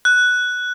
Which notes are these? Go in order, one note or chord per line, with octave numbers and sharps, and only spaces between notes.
F#6